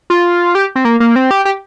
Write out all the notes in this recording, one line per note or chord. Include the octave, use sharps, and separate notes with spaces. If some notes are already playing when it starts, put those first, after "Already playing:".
F4
G4
C4
A#3
A#3
C4
G4
G4